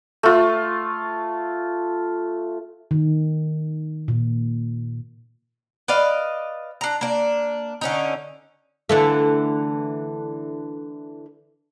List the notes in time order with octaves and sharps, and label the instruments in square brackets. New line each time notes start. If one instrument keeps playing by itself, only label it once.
[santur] A3 F4
[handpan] D#3
A#2
[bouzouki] B4 D5 D#5 F5
D4 A#5
A#3 D4
D3 C#4 D#4
[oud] D3 E3 A3